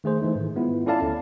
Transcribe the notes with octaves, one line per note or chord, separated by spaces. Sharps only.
D#3 A3 G#4 C5
E3 A3 D#4
G#2 D#3
G#3 B3 E4 F4
C#4 E4 A4 D5 F5 A5
D2